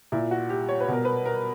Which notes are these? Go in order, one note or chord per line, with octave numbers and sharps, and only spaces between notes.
A#2 E4
F#4
G4
C#5
B4
B2 A#4
B4
A#4